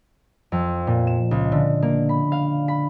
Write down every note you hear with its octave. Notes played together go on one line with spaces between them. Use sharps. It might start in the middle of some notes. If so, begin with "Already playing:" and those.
F2
A#2
E7
C#2
D3
A#3
B5
F5
B5